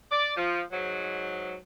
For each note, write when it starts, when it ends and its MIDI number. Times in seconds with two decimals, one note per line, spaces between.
0.11 0.31 74
0.37 0.61 53
0.72 1.54 44
0.72 1.54 54